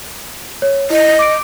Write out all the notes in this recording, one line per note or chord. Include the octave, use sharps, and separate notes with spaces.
C#5
E4 D#5
D6 D7